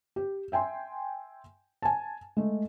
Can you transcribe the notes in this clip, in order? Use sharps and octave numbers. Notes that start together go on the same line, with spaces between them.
G4
E5 G5 G#5 C6
G#5 A5
G#3 A3